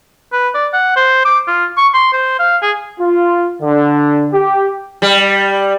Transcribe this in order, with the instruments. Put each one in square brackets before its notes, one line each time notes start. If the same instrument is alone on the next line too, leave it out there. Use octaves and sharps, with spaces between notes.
[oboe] B4
D5
F#5
C5
D6
F4
C#6
C6
C5
F5
G#4
[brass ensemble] F4
D3
G4
[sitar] G3